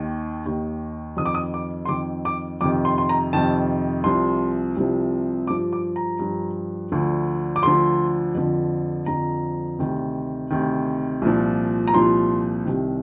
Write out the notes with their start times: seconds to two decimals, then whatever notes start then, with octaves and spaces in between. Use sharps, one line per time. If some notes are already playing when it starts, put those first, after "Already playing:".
Already playing: D#2 D#3
0.46 D#2 D#3
1.17 F2 D#3 D#6
1.26 D6
1.35 D#6
1.54 D6
1.85 C6
1.89 F2 D#3 D6
2.25 D6
2.61 F2 C3 D#3 D6
2.85 C6
2.98 C6
3.09 A#5
3.33 F2 C3 D#3 A5
4.04 C2 C3 F3 C6
4.77 C2 C3 F3
5.47 G2 F3 D6
5.73 D6
5.96 A#5
6.19 G2 F3
6.92 D2 D3 F3
7.56 D6
7.63 D2 D3 F3 C6
8.35 F2 D3 F3
9.06 F2 D3 F3 A#5
9.79 D2 C3 D#3
10.50 D2 C3 D#3
11.22 C2 A#2 F3
11.88 A#5
11.94 C2 A#2 F3 C6
12.66 C2 C3 D#3